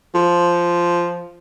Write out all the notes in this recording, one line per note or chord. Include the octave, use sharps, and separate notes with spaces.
F3